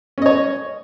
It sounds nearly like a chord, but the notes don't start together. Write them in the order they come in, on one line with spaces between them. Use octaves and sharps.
C#4 D#5 C#5